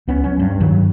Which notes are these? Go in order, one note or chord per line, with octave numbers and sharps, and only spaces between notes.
C#2 B3 C#4
F#3 C#4
G2
G2 D#3 F#3